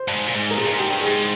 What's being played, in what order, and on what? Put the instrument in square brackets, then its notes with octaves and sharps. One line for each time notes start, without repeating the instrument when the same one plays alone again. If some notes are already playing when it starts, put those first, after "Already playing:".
Already playing: [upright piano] C5
[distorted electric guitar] G2
G#2
A#2
G#2
[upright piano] A#4
[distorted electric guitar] A#2 [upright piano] G#4
[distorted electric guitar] G2
G#2
[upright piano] G4
[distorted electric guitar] G2
[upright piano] G#4
[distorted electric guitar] G#2